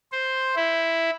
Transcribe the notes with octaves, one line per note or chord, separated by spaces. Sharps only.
C5
E4